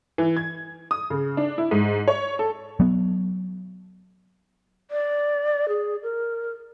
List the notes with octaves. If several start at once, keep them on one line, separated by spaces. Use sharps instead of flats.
E3
G#6
D#6
C#3
D4
E4
G#2
C#5
A4
F#3 B3
D5
G#4
A#4